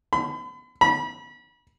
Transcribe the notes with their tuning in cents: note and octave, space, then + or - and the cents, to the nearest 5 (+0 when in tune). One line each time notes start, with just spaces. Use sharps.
B5 +40
B5 -35